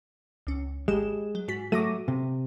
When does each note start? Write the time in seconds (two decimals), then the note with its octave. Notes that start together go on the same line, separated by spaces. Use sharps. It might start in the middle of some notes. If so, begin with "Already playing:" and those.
0.47 C#2 C#4
0.88 G#1 G#3 G4 E7
1.35 F#3
1.48 G#2 F#4 B6
1.72 F#3 A3 D6 A#6 D#7
2.08 C3